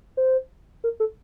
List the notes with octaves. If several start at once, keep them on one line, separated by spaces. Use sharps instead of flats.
C5
A#4
A4